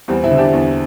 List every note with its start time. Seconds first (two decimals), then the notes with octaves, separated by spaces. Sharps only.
0.08 E2 G3 C4
0.24 C4 E4
0.31 D3
0.38 D4 G4
0.53 E2